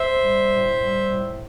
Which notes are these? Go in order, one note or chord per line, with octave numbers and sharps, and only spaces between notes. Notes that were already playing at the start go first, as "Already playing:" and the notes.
Already playing: C5 E5
G3
A2
G3
A2